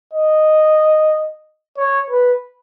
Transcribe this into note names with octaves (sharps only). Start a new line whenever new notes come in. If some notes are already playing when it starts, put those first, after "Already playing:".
D#5
C#5
B4